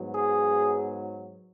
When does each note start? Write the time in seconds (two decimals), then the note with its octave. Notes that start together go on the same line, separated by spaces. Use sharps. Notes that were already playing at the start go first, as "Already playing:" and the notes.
Already playing: G#2 F#3 B3
0.14 G#4